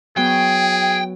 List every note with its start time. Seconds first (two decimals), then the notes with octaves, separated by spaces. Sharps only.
0.17 F#3 B3 G#4 G5